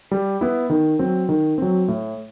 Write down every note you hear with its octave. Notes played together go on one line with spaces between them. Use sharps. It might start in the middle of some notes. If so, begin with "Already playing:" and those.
G3
B3 E4
D#3
F#3 C4
D#3
F#3 C4
A2